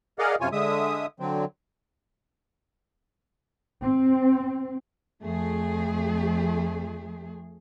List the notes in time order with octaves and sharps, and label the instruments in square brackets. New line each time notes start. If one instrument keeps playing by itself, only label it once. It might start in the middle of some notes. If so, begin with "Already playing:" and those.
[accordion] G#4 A#4 D5 D#5 F5 F#5
F#2 C3 F4 C#5 G#5
D3 G#3 E5 D#6
D3 F#3 C4
[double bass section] C4
[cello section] F2 F3 A3 G#4